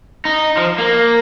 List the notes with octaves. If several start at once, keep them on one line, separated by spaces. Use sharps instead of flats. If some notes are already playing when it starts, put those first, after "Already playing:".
D#4
F3
A#3